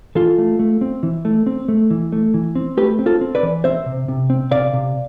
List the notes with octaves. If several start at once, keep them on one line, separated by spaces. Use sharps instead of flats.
E3 F4 A4
A3
A3
C4
E3
A3
C4
A3
E3
A3
E3
C4
A3 G4 B4
C4
F4 A4
C4
B4 D5
E3
C4 C5 E5
C3
C3
C4
C3 D5 F5
C3